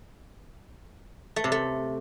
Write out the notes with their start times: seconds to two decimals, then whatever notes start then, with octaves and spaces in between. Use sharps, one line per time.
1.36 A3
1.44 C3
1.52 A3